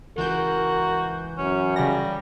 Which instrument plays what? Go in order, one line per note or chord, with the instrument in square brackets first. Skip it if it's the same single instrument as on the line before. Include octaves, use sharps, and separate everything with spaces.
[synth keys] C#2 G6 [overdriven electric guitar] E3 [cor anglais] F#4 [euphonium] A#4
[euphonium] F#2 [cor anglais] C#4
[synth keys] C#3 A#6 [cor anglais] G3